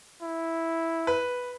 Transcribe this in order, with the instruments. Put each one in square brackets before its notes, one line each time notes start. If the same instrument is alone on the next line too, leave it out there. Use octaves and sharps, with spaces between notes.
[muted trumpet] E4
[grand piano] B4